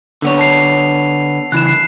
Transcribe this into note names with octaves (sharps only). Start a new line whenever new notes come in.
D3 B3 C#5
A5 C7 F7
C#3 E3 F#6 E7
C7